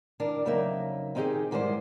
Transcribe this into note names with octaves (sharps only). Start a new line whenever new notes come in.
D#3 D4 A#4
F2 C#3 F#3 A#3 D#4 E5
D#3 C4 D#4 F4 G4 G#4
G#2 D#3 E3 G3 C5